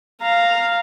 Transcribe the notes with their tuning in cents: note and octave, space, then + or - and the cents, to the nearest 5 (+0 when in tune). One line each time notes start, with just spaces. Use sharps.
F5 +0 A#5 -10